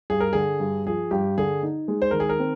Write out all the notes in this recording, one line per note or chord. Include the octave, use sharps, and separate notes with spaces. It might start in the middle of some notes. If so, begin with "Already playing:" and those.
G2 G#4
A#4
D3 G#4
G2
F3 G#4
G2 G4
D3 G#4
D#4
G#3
C5
D#3 A#4
G#4
A#4
C4